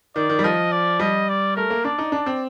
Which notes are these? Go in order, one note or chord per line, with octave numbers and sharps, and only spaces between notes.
D#3 D5
D#3
G3
F3 D#5
D5
G3 D#5
D5
A3 A#4
A#3
D4 D5
D#4
D4 D5
C4